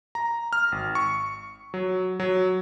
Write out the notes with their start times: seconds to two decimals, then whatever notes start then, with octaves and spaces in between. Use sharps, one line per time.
0.15 A#5
0.53 F6
0.72 G#1
0.95 C#6
1.74 F#3
2.20 F#3